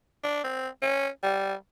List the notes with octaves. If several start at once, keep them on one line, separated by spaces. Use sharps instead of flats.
D4
C4
C#4
G3